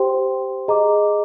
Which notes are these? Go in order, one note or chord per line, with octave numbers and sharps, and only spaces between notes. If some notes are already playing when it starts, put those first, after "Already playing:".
Already playing: G4 C5 G5 C6
G#4 D#5 A#5 D6